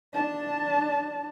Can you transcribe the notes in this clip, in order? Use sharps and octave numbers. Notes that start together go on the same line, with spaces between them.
D4 A5